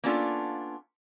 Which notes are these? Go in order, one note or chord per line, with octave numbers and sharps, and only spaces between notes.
A#3 B3 C#4 D4 F4 A4